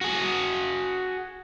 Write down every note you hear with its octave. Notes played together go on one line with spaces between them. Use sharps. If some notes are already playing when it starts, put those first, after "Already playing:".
F#4 G#4